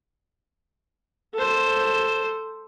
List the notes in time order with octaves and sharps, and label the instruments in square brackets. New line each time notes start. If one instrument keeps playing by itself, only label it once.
[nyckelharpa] A4 C5